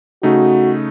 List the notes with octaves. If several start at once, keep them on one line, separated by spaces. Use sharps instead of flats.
C#3 A3 D#4 F#4